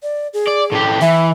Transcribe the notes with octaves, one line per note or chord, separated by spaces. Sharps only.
D5
G#4
D5
A2 G4
E3 E5